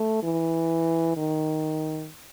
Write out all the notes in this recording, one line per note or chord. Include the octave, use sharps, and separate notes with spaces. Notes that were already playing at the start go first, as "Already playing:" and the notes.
Already playing: A3
E3
D#3